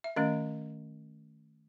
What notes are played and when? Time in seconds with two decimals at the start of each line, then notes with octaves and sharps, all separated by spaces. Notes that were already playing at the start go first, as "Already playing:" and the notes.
0.04 E5
0.16 D#3 A3 C#4 D#5